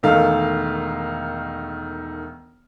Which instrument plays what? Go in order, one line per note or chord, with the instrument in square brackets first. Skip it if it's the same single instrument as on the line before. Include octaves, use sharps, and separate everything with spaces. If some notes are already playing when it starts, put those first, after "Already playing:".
[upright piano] E1 D#3 A3 F5